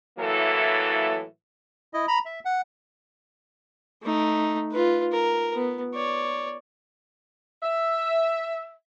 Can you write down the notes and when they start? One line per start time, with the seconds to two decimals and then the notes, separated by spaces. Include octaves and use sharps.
0.18 A2 E3 F#3 A#3 E4 A4
1.94 E4 D#5
2.08 A#5 B5
2.25 E5
2.45 F#5
4.02 A3 D#4
4.71 F4 B4
5.12 A#4
5.54 B3
5.94 C#5 D5
7.63 E5